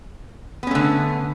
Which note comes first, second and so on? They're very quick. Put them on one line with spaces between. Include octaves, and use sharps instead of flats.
B3 C#4 A3 D3